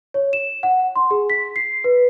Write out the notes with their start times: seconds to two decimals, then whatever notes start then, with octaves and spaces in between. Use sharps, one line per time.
0.14 C#5
0.33 E7
0.63 F#5
0.95 C6
1.11 G#4
1.30 B6
1.56 C7
1.84 B4